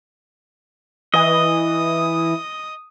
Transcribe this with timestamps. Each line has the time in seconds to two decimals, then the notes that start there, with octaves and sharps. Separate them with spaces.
1.14 E3 D#5 D#6